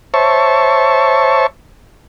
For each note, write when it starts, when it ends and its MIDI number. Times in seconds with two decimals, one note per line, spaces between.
0.14 1.47 72
0.14 1.47 73
0.14 1.47 76
0.14 1.47 81
0.14 1.47 85